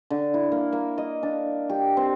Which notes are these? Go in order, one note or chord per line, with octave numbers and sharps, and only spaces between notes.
D3
E4
A#3
A#3
D#5
D4
G4
C4